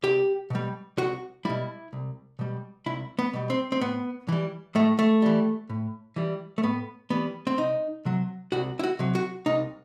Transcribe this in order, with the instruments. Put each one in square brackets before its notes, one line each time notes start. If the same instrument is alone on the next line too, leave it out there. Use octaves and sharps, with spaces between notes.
[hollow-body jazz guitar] C2 G4
B2 G3
C2 F#4
B2 G3 E4
C2
B2 G3
C2 E4
B3
B2 G3
C4
C4
A2 B3
E3 G3
A2 A3
A3
E3 G3
A2
E3 G3
A3
A2 B3
E3 G3 B3
C4
C2 D#4
C3 F#3
C2 F#4
E4
F#4
C3 F#3
F#4
C2 D#4